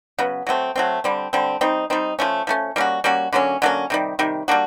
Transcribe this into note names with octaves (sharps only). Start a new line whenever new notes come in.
C#3 F#3 B3
F#3 A3 C4
F#3 A3 C4
D3 G3 C4
D3 G3 C4
G3 C4 D#4
G3 C4 D#4
F3 A3 C#4
F3 A3 C#4
G3 A#3 C#4 F#4
G3 A#3 C#4 F#4
D3 F#3 A#3 C#4
D3 F#3 A#3 C#4
C3 D#3 G3
C3 D#3 G3
G3 A#3 D4 F#4